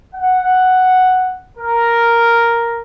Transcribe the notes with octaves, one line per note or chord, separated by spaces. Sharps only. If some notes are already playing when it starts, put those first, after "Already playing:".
F#5
A#4